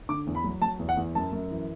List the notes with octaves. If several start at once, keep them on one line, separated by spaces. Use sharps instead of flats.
D3 D6
E2
B5
F#3
F#3 A5
E2
F#5
E2
F#2 A5
F#2
E3